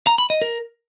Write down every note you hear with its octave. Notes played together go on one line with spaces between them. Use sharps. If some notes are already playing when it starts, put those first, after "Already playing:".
A#5
B5
D#5
A#4